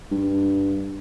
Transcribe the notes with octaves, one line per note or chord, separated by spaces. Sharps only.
G2